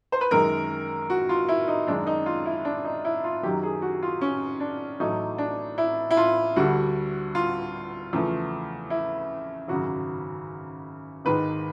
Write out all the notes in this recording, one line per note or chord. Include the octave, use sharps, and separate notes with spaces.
C5
B4
F#2 D#3 G#3 A#4
F#4
F4
E4
D#4
F#2 D#3 G#3 D4
D#4
F4
E4
D4
D#4
E4
F4
F#2 D#3 F#3 G4
G#4
F#4
F4
C#4
D4
A1 A2 F#3 A3 D#4
D4
E4
E4
F4
D2 D3 G3 F#4
F4
E2 C#3 F3 A3
E4
G#1 F#2 C#3 F#4
G#1 G#2 D#3 G#3 B4